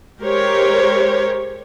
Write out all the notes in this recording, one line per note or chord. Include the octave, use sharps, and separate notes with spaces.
G#3 G4 A#4 C5 C#5